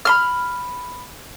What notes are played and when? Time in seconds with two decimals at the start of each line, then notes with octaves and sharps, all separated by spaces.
0.05 B5 C6 F6